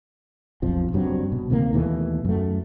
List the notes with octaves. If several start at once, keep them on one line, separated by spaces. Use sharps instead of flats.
B1 F2 F3
F#1 G2 F#3 C4
B2
D2 C3 D#3 A#3
D#2 B2 E3 A3
F#2 A3